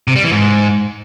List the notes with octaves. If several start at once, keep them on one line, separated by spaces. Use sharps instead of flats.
C3
G3
E3
G#2